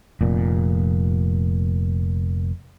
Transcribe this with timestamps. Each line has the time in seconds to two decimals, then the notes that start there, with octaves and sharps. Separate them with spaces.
0.21 F1 A#2